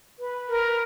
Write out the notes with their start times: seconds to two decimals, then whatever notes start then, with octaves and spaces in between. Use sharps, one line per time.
0.19 B4
0.49 A#4